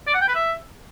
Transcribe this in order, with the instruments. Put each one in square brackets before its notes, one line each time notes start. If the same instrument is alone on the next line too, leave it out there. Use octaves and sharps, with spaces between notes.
[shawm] D5
F#5
G5
B4
E5